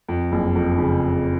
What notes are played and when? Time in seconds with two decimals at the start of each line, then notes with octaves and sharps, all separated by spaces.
0.09 F2
0.32 F#1
0.55 F2
0.79 C#3